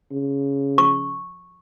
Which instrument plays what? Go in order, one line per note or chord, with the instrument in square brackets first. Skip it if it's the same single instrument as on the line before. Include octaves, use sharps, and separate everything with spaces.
[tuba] C#3
[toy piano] C#6